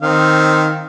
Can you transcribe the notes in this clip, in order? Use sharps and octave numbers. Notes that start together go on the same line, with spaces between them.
D#3 C4 F5